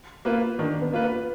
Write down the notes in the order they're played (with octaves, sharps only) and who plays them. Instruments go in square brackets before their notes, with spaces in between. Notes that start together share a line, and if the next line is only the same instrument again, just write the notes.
[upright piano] A#3 F4 B4 [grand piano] B3
[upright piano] D#3 [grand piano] D4
[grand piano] B3
[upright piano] A#3 F4 B4
[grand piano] B3